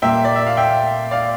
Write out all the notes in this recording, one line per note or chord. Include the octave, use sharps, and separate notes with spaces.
A#2 G3 A#3 E5 G5
D5
E5
F5
E5 G5
D5 F5